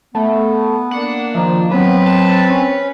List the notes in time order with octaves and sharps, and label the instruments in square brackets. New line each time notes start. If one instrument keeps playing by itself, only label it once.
[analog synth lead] A3 [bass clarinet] B3
[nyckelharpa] A#3 D4 [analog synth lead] F#5
[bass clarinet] D#3 [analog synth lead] F3 [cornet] D#4
[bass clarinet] F#3 [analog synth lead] B3 [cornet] C4 [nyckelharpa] B4
[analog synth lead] A5
C#4